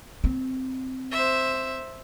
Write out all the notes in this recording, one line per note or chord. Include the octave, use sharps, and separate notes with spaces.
C4
C5 E5